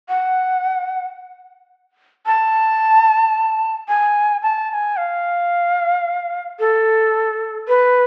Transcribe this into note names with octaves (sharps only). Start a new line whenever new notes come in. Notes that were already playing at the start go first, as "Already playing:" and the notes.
F#5
A5
G#5
A5
A5
G#5
F5
A4
B4